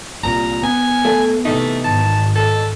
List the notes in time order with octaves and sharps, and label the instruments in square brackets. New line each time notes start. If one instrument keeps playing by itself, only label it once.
[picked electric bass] C2 A#2 [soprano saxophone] A#5
[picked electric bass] B3 [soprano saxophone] G#5
[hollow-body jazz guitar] A3
[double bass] C3 E3 [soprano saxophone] A3 [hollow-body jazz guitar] D#4
[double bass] G#1 [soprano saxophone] A5
[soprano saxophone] A4